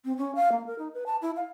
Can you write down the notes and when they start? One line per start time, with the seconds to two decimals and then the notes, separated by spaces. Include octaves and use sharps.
0.05 C4
0.18 C#4
0.35 F5
0.52 A#3
0.67 A#4
0.79 D#4
0.94 B4
1.06 A5
1.22 E4
1.36 F5